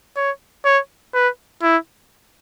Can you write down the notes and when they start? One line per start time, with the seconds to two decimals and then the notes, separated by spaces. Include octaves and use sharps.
0.16 C#5
0.65 C#5
1.14 B4
1.62 E4